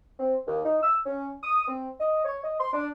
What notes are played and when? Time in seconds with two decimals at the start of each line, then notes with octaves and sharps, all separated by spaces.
0.20 C4
0.47 D#2
0.65 D#4
0.82 E6
1.05 C#4
1.42 D#6
1.67 C4
2.00 D#5
2.25 C#5
2.43 D#5
2.60 C6
2.73 D4